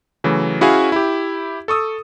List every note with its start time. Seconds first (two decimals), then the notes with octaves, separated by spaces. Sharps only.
0.24 C#3 E3 F#3 A3
0.61 C#4 E4 F#4 G#4 F5 G#5
0.92 E4 G4
1.68 A4 C#6 D#6 E6